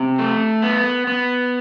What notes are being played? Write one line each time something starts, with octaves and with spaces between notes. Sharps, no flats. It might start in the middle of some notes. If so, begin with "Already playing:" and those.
Already playing: C3
A3
B3
B3